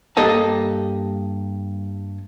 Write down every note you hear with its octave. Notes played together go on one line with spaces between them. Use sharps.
G2 A#3 G4 A4 D#5 A5